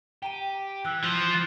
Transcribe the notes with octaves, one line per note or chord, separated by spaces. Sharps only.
G4 G5 A#5 D#7
E3 E6 F#6
F3 F7